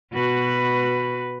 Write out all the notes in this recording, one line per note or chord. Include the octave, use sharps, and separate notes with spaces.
B2 F#4 B4